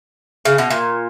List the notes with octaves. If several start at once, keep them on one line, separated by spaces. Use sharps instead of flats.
C#3
B2
A#2